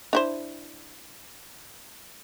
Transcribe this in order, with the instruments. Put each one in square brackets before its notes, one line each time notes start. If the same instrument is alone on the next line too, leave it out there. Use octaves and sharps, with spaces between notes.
[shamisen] D4 E4 C5